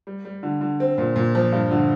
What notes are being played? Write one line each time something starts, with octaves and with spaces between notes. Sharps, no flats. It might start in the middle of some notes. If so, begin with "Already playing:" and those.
G3
G3
D3
D3
C4
A#2
A#2
F3
G2
D3